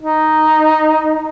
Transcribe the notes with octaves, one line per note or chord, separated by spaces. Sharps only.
D#4